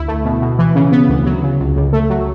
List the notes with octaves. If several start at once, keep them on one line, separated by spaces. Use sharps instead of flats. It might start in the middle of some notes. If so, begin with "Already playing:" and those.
Already playing: D2 E4
A3
B2
B2
E3
C#3
B3
D2
F#3
C#3
C#2
C#2
A3
F#3